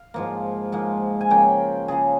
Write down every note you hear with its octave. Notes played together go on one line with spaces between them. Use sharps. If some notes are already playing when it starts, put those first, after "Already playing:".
Already playing: F5
G#2 F3 A#3
G#2 F3 A#3
G#5
C#3 F3 A#3 G5
C#3 F3 A#3 G#4